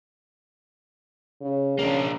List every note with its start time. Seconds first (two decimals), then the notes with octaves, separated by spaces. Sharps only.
1.41 C#3
1.79 C#3 A#3 D4